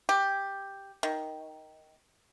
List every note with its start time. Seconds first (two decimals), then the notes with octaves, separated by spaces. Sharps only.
0.09 G4
1.03 D#3